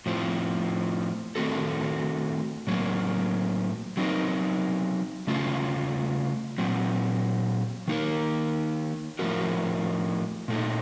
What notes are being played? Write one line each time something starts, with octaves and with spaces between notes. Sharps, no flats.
A2 F3 C4
D#3 A3 C4 F#4 A4
A2 F#3 A#3
F#3 C4 D#4 A#4
C#3 A3 C#4 F4
A#2 F#3 C4
D#3 A#3 D#4 A#4
A2 F3 C4 F#4 A#4
A#2 A3 D#4